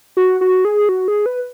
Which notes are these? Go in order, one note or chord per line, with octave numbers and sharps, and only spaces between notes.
F#4
F#4
G#4
F#4
G#4
B4